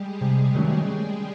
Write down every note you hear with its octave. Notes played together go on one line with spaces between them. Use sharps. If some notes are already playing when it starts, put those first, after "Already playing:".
Already playing: G3 G#3 G4 G#4
C3 G3 G4
D#3 F#3 G#3 A3 C#4 G#4